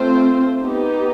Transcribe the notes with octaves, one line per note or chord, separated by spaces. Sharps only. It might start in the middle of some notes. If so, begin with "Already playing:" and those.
Already playing: A3 C4 F4 A4 C5
B3 D#4 G4